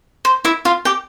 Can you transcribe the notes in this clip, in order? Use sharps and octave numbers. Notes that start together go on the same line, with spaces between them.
C5
E4 E5
F4 F5
G4 G5